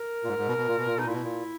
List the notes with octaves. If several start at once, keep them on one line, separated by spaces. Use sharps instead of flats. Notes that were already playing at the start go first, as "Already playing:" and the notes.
Already playing: A#4
A#2
G#2
G#2
B2
B2
A#2
B2
A#2
B2 D#4
A#2 E4
B2
A#2